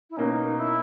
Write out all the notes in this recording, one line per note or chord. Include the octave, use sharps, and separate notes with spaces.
E4
B2 A#3 C#4 D#4
E4